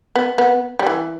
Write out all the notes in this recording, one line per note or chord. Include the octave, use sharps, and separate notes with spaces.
B3
B3
G3
E3